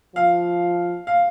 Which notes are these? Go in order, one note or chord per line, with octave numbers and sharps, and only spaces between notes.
F3 F5
F5